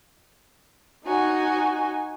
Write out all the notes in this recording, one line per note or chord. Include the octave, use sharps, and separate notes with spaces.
D#4 F#4 G#5